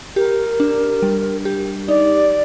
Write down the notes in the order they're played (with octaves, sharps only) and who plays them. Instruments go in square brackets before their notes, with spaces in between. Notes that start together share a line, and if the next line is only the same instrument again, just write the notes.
[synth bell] G4 [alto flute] A#4
[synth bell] D4
G3
G4
[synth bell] D#4 [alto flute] D5